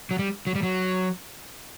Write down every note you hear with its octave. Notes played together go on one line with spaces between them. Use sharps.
F#3
G3
F#3
G3
F#3